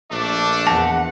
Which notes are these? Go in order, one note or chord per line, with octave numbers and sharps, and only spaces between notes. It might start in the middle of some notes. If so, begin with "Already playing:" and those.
A#1 A3 D4
E2 F#5 A5